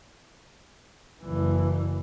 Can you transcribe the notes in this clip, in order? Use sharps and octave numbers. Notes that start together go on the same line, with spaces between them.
F#1 E3